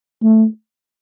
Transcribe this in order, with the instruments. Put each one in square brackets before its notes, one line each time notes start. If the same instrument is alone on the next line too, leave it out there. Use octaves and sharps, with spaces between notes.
[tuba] A3